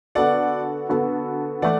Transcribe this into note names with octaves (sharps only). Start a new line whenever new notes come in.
D3 B3 F#4 A4 D5 F#5
D3 B3 F#4 A4
E3 A3 D5 F#5